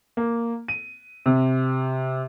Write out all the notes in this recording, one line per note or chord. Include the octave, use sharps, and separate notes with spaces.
A#3
D#7
C3